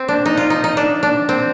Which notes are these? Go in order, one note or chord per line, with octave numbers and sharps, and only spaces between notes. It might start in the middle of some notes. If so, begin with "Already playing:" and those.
Already playing: C4
D4
D#4
F4
D#4
D#4
D4
D4
C4